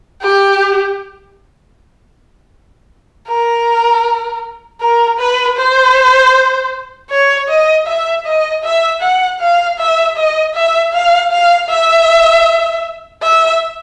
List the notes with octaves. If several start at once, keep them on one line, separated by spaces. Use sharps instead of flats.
G4
A#4
A#4
B4
C5
C#5
D#5
E5
D#5
E5
F#5
F5
E5
D#5
E5
F5
F5
E5
E5